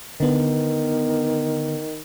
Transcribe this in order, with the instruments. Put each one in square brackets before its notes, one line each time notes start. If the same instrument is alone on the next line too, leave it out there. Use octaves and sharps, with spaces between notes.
[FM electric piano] D3 B3 [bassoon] D#3